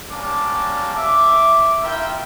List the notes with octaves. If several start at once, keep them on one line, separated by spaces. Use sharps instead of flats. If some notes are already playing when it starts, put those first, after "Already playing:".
G3 A#3 C#4 D4 A5 D6
E5 D6
E4 F4 A#4 E5 G5